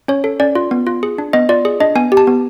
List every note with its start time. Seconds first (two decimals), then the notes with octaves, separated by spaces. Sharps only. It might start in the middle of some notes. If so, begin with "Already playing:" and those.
0.08 C#4 C#5
0.24 A4
0.40 C#4 D5
0.55 F4
0.71 B3
0.87 F4
1.03 G#4
1.18 D4
1.33 B3 D#5
1.49 F4 D5
1.65 G#4
1.80 D4 D#5
1.95 B3 G#5
2.12 G4
2.17 A5
2.27 B3